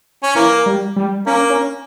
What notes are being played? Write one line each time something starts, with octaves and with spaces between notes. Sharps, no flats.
C#4
E3 A#3
G3
G3
A#3 C#4
C#4